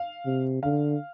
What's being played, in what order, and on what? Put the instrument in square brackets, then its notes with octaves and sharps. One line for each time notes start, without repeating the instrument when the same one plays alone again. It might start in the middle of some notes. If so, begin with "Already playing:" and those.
Already playing: [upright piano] F5
[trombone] C3
[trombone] D3 [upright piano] F5